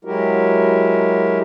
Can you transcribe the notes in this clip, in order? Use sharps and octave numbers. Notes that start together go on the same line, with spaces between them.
F#3 G#3 E4 F#4 G4 A#4